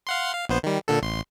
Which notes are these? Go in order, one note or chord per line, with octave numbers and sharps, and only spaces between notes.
F5 F#5 C6
F5
A#1 B3 C5
D#3 G3
A#2 D3 A4
A1 C6